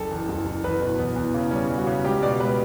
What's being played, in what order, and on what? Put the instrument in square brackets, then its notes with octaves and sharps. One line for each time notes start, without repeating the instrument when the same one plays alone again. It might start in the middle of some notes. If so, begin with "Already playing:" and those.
Already playing: [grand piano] F#1 A4
E2
F#1
F#1
E2 B4
B2
E2 B3
E2
C#3
G3 C#4
G3
F#4
C#3
C#2 G4
B2 D5
C#2 B4